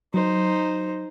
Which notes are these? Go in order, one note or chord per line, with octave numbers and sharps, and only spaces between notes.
F#3 D#4 C5